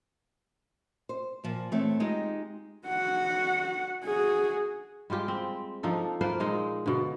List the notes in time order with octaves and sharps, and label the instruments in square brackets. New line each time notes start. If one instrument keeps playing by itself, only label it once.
[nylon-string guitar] C5
A#2 F3
E3 A3 C4 C#5
G#3 D#4 F4 G4
[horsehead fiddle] F#4 F#5
F#4 G#4
[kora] G3 G#3 F4 G4
C4
F3 D4 D#4 A4
A#3 F4 B4 C5
A#2 G#3 D#4
B2 D3